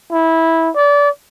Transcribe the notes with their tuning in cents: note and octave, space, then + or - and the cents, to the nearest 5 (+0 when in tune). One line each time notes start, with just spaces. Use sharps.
E4 -15
D5 -30